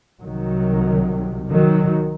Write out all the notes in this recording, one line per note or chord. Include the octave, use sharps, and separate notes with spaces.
C2 C3 D#3 F#3
D#3 F#3